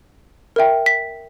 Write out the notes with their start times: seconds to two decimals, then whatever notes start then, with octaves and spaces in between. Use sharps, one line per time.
0.56 A#4 E5 G5
0.86 B6